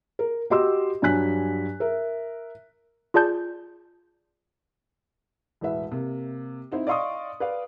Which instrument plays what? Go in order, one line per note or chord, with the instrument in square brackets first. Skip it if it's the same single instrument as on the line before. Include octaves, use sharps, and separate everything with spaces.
[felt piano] A#4
F#4 G4 D#5 C6 D6 E6
G2 F#3 G#5 F#6 B6
A#4 E5
[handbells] F4 G#4 D5 A5 G6
[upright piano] E1 A2 B4 E5
C3 A#3
C4 D#4 E4 C5
D5 D#5 F5 C6 C#6 D#6
B4 D5 F5